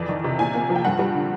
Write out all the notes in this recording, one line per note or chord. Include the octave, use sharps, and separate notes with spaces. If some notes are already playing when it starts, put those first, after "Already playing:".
Already playing: F2 E3 D5
D#3
C3
A#2 G#5
A#3
F3
G5
G2 F#5
G3
D3